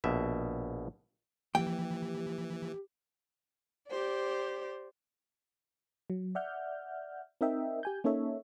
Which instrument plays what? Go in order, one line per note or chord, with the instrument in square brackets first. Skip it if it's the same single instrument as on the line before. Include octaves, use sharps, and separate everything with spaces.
[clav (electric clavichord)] A#1 B2 E5
[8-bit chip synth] E3 [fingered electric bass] F3 A#3 [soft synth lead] G4 [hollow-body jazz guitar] G5
[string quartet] G4 C5 D5
[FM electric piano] F#3
D5 E5 F#5 F6 G6
C4 D#4 A#4 D#5 E5 G5
G4 G#5 G6
A#3 C#4 D#4 A4 C#5 E5